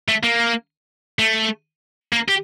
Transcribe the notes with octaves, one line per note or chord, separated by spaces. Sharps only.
A3
A#3
A3
A#3
G4